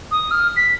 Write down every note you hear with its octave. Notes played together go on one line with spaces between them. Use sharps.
D#6
F6
B6